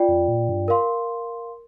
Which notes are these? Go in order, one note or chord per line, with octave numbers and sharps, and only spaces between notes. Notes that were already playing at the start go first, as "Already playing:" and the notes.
Already playing: F4 D5 G5
F2
A#2
G2
A#4 F5 C6